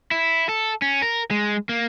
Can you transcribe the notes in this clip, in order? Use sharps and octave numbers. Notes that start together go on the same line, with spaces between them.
E4
A4
C#4
A#4
G#3
A#3